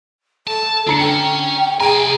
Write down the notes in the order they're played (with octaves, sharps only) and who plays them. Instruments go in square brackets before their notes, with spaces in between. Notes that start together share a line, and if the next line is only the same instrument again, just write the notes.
[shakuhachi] A4 [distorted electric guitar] A5
[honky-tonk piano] D3 A#5 C#7 [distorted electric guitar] D4
[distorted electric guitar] C#4 [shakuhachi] G5
[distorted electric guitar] C3 G#5 [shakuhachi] G#4 [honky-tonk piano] A#5 D7